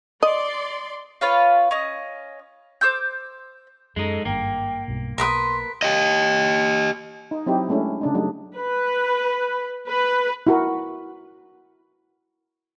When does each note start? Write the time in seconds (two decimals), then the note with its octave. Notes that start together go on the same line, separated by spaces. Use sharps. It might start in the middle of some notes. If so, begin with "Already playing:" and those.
0.23 D5 D#5 C6
1.21 F4 B4 C#5 F5
1.71 C#4 D#5
2.81 C5 D6 E6 G6
3.96 F#2 G#3 D#4 A4
4.25 G#1 G2 A#3 G5
4.88 B1 G2 B2
5.18 B1 A#4 B4 C6 D#6
5.82 G4 D#5
7.31 D#4
7.46 F#3 C4 D#4 E4 G4
7.69 G#3 A3 C#4 D4 E4
8.01 C#3 D4 D#4
8.15 F#3 G3 A3 C4 D4 D#4
8.57 B4
9.88 B4
10.47 E4 F#4 A#4